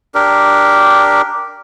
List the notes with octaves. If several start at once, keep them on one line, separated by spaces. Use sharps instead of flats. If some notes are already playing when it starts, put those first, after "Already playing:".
D4 G4 A#4